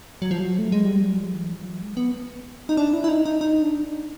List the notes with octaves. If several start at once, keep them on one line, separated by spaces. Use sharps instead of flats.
F#3
F3
F#3
A3
G#3
G3
F#3
F3
E3
F3
F#3
G#3
B3
D#4
D4
E4
E4
D#4
D#4
D#4
D4